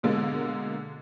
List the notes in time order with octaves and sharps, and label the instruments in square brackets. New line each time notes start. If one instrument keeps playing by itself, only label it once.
[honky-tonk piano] B2 D3 G#3 A#3